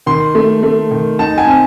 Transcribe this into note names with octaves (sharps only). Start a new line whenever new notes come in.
D#3 C6
A3
A3
D#3
D#4 A5
G#5
C4